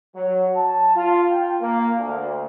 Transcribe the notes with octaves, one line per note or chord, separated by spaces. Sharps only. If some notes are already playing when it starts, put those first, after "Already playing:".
F#3
A5
F4
G5
A#3
D2